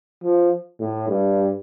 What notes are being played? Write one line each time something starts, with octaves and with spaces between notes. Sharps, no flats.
F3
A2
G2